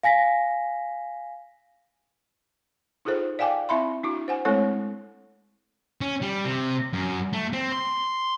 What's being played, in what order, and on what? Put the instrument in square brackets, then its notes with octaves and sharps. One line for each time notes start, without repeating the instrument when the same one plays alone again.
[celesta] F5 G#5 A#6 B6
[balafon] D#4 F4 G#4 A4 C5
D5 F5 G5 G#5 D6
C4 E4 E5 B5 C6
D4 E4 F#4
C5 F#5 G#5
G#3 A3 C4 E4 A4 C#5
[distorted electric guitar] C#4
G3
C3
F#2
A3
C4
C6